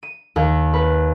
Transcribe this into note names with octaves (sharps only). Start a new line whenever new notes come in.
D#7
D#2
B4